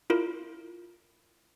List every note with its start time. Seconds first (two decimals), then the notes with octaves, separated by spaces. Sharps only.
0.10 E4 F4 A#4